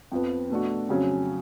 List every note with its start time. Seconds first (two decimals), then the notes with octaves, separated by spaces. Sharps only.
0.12 F2 F3 B3
0.50 B2 A3 D4 F#4
0.89 F2 C#3 F#3 C#4